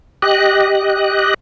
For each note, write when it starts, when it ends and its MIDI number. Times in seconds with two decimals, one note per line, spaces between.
0.22 1.34 67
0.22 1.34 75
0.22 1.34 90